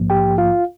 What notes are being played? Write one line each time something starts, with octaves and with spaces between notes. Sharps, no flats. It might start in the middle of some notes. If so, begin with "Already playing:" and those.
Already playing: A#1 G#2 F3 A#3
G4 G5
F4 F5